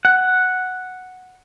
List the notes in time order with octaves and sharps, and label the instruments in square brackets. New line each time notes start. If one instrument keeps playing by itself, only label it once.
[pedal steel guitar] F#5